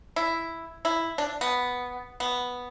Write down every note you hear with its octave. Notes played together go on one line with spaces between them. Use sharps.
E4
E4
D4
B3
B3